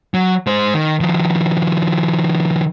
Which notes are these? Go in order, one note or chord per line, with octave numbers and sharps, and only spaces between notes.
F#3
G#3 C5
D#3
D#3 F3